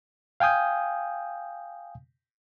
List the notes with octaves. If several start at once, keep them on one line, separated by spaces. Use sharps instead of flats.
F5 G5 G#5 D#6 G6